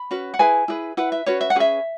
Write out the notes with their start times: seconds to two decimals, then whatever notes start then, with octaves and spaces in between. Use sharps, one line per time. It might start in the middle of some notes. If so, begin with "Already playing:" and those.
Already playing: B5
0.11 C#4 F#4 B4
0.34 F#5
0.39 E4 G#4 B4 G#5
0.68 E4 G#4 B4
0.97 E4 B4 F#5
1.12 E5
1.26 C#4 F#4 B4 C#5
1.41 E5
1.50 F#5
1.55 C#4 G#4 B4 E5